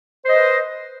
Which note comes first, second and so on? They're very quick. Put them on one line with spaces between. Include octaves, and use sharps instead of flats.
C5 D#5 B4